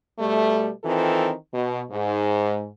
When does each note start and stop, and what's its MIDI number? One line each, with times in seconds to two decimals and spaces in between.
0.19 0.70 47
0.19 0.70 55
0.19 0.70 57
0.84 1.32 51
0.84 1.32 52
0.84 1.32 60
0.84 1.32 65
0.84 1.32 69
1.54 1.81 47
1.91 2.67 44